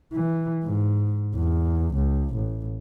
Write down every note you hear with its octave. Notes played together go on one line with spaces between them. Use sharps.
E3
G#2
E2
C#2
A1